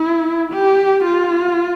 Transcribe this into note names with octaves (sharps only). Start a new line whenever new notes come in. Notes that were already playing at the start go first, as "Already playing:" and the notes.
Already playing: E4
G4
F4